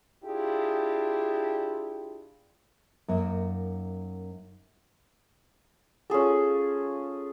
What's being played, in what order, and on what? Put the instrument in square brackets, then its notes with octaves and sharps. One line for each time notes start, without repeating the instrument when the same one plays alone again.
[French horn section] D4 E4 F4 G4 G#4
[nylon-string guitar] F#2 A#3 D#4
[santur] C#4 F4 G#4 A4